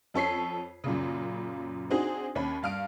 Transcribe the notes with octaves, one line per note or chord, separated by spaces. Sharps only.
F2 A4 C#5 B6 C7
F#2 A#2 C#3
C4 D4 D#4 F#4 G#4
D#2 C#4 B5
G2 F5 F6 D7